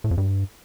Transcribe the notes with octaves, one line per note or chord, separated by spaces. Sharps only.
A2
F2
G2